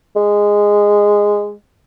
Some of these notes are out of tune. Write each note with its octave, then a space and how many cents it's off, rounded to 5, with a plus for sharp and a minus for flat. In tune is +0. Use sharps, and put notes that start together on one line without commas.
G#3 -10